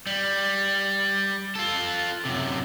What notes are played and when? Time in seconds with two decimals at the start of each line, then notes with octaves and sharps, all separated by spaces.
0.07 G3
1.55 F4 A4
2.25 F#2 C3